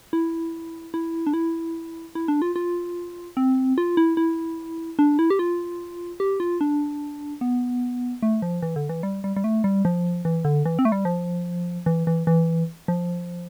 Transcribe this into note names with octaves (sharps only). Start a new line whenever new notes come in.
E4
E4
D4
E4
E4
D4
F4
F4
C4
F4
E4
E4
D4
E4
G4
F4
G4
F4
D4
B3
A3
F3
E3
D3
E3
G3
G3
G3
A3
G3
F3
E3
D3
E3
C4
A3
G3
F3
E3
E3
E3
F3